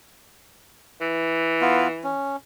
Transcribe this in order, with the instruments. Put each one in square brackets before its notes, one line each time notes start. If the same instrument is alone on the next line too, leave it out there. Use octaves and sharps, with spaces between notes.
[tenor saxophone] E3
[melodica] B3 F4
C#4